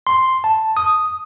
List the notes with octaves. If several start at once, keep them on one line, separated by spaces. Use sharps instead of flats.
C6
A5
D#6